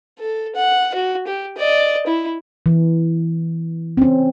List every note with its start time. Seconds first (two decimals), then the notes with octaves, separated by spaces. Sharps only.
0.19 A4
0.56 F#5
0.94 F#4
1.27 G4
1.58 D5 D#5
2.07 E4
2.66 E3
3.97 C4 C#4